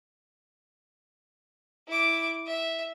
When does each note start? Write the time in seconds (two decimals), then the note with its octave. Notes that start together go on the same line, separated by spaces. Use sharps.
1.88 E4 D6
2.47 E5